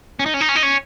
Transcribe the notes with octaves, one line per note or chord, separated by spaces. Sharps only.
C#4
D#4
C#4
D#4
C#4
D#4
C#4